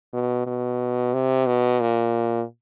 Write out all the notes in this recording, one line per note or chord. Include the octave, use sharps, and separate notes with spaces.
B2
B2
C3
B2
A#2